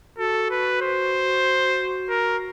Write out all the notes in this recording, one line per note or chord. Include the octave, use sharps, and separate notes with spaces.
F#4 A4
B4
C5
A#4